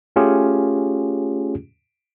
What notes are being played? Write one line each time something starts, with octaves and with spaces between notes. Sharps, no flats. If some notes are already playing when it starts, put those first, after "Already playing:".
A3 C#4 F4 G4 G#4